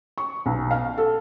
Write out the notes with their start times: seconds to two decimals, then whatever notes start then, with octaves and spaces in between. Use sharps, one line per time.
0.18 C#6
0.46 B1
0.71 F5
0.98 A4